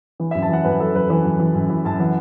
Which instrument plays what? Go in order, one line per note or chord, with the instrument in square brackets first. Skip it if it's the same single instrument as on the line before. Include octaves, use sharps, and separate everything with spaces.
[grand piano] E3
E5
F#2
A5
E3 F#5
F#2 B4
E3 A4
F#2 B4
E3 B4
F#2
E3
F#2
E3
F#2 A5
E3 F#5